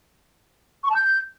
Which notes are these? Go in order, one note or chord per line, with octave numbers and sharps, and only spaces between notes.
C#6
A5
G6